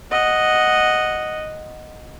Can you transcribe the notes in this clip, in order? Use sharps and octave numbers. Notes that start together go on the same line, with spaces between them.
D#5 F#5